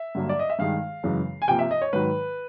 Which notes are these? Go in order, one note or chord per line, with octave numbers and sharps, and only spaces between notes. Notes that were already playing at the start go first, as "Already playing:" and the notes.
Already playing: E5
G2 D3 F#3 A#3
D5
D#5
E5
G2 D#3 G#3 F5
F#2 C#3 E3 G#3
G#5
C3 F3 A#3 G5
E5
D#5
C#5
G#2 D#3 F#3 B4